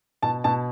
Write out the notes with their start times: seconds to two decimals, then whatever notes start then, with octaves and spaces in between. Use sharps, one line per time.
0.23 B2 A5
0.44 B2 A5